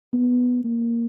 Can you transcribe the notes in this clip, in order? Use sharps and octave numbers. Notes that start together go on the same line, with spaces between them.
B3
A#3